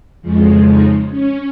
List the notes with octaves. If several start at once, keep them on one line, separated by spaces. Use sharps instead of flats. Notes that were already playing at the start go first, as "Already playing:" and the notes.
F2 C#3 F3 G#3
D#4
C#4